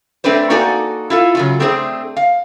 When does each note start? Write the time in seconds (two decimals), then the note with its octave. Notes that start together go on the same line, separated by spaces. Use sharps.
0.24 A3 C4 D4 B4 C5
0.50 A#3 D#4 F#4 A4 D5 G#5
1.10 E4 F4 A4
1.35 C#3 F#3 F4
1.60 A3 C4 D4 G#4 A4 C5
2.17 F5